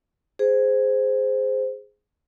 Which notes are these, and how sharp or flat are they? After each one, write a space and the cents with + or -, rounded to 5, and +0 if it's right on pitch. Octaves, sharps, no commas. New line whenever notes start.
G#4 +0 C5 -10